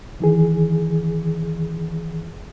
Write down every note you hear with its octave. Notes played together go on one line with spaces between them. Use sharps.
D#3 E3 G#4